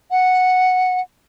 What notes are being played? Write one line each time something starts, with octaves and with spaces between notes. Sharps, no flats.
F#5